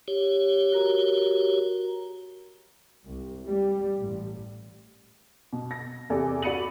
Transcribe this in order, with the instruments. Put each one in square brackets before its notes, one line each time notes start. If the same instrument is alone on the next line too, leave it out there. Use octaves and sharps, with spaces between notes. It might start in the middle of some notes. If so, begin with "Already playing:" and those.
[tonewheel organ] G4 C#5
[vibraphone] F#4 A#4 A#5
[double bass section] C2
G3
A1
[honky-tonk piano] B2
A#6
E2 C3 G4 A4 D5
F#4 D5 B5 C#7 D#7 F#7